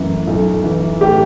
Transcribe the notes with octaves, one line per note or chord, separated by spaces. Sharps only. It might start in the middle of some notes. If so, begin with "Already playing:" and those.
Already playing: F#2 E3 A3
B1
E3
A2 G4